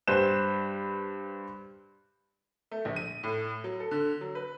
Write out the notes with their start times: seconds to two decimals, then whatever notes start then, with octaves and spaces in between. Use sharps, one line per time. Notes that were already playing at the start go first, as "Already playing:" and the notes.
0.08 G2 B4 C5 G6 E7
2.71 A3
2.85 A#1
2.96 D#7
3.23 A2
3.64 F#3
3.80 A4
3.91 D3
4.21 F#3
4.35 B4